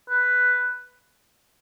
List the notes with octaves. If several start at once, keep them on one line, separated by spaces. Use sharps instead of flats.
B4